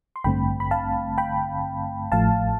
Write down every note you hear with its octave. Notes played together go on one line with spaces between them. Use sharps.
C6
A1 G2 D3 A3 C4 G5 B5
B5
F5 A5
G5 B5
A1 A2 F3 A3 F5 A5